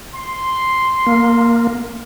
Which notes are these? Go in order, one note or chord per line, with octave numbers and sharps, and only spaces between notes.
C6
A#3